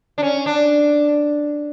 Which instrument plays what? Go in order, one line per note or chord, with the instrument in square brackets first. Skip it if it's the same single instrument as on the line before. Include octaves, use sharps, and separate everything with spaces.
[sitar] D4
C#4
D4